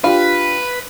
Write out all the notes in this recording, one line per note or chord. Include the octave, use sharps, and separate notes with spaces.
D4 F4 G4 B4 F5